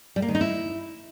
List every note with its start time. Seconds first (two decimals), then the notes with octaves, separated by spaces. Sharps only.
0.16 G3
0.22 A#3
0.28 D#3
0.35 D#4
0.41 E4